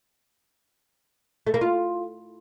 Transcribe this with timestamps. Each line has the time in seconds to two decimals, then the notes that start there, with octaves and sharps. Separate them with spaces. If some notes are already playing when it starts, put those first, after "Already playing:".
1.47 A3
1.54 A#3
1.61 F4